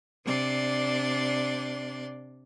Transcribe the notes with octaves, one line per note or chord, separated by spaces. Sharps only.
C3 D4 D5 C6